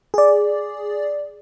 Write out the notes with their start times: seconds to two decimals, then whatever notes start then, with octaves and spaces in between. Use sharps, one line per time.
0.14 G#4 D5